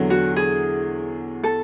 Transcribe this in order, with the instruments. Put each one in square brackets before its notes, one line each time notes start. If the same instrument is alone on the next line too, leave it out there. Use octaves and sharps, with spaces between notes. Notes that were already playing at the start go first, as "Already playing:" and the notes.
Already playing: [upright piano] E2 D3 F#3
[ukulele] F#4
G#4
A4